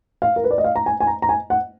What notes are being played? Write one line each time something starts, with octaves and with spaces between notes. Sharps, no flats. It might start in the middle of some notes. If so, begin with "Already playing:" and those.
F5
A#4
B4
D5
D#5
F5
A#5
G#5
G#5
A#5
A#5
G#5
F#5